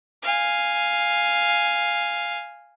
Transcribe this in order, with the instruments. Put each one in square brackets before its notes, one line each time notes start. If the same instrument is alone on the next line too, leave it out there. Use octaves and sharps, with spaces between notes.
[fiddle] F5 G#5